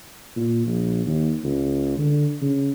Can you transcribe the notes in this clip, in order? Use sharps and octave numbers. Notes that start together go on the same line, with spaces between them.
A#2
A#1
D#2
C#2
D3
C#3